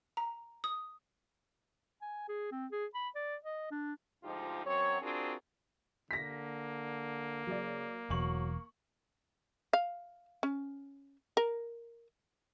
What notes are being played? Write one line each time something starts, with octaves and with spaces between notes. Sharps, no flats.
A#5
D#6
G#5
G#4
C4
G#4
B5
D5
D#5
D4
D2 G#2 F3 D#4 F4 G4
F#2 F#3 C4 C#5
C4 D4 F4 F#4 G#4 A#4
D3 A#3 A#6 B6
C#3 F#3 D5
E1 F#3 C#6 F#7
F5
C#4
A#4